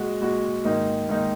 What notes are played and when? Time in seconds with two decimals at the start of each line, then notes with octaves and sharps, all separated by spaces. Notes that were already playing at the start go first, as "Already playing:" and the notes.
Already playing: A#2 G#3 F#4
0.21 A#2 G#3 F#4
0.64 G#2 D#3 A#3 D#4
1.09 G#2 D#3 A#3 D#4